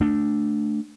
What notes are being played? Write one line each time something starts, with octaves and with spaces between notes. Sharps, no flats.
A3 D4